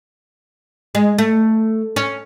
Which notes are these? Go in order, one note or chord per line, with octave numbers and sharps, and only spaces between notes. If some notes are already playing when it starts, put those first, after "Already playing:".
G#3
A3
C#4